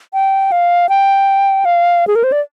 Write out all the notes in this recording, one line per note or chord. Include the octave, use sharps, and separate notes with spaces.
G5
F5
G5
F5
G#4
A#4
C5
D5